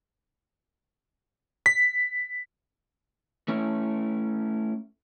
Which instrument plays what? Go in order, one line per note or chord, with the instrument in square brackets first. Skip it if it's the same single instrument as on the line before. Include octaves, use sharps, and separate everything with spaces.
[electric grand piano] B6
[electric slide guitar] A3 C#4 E4